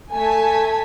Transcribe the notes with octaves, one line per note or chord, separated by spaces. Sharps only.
A3 G#5 A5 G#6 B6